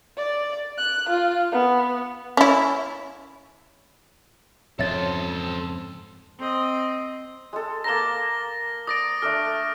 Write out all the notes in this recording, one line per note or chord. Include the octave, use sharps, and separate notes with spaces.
D5
F#6
F4
B3
C#4 E4
F2 G#2 C#3 A4 C5 C#5 E5 A6
C4 D#5
G#3 A4
A#3 A5 A#5 A#6 G7
D5 D#6 A#6 D7
A3 D4 A4 F6